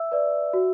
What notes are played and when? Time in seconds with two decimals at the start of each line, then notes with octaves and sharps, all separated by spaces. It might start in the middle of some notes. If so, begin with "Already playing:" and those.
Already playing: E5 E6
0.12 B4 D5
0.53 F#4